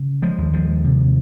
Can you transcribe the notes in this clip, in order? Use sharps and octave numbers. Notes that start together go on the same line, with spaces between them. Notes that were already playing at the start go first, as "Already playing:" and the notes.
Already playing: C#3
F3 G#3
D#2
F3 G#3
C3